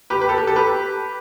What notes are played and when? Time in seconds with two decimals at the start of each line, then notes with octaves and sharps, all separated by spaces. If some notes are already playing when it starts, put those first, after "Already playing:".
0.10 G4 B4
0.21 B4
0.29 A4
0.38 G4
0.47 A4
0.56 G4 B4